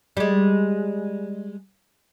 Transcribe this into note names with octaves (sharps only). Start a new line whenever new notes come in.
G3 G#3